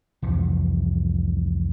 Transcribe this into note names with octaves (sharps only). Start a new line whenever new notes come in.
C2 F2 E3